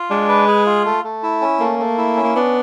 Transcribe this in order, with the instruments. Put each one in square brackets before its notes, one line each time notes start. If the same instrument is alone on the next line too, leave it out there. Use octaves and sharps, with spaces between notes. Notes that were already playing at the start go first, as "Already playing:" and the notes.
Already playing: [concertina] F4
[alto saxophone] G#3 [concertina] D4
[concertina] B4
G#4
F4
A3
A3
E4
C#4
[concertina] A3 [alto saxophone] A#3
[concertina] A3
E4
C#4
[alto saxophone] A#3
[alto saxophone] B3 [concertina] D4